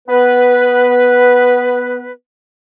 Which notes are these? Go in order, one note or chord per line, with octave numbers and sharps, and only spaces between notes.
B3 B4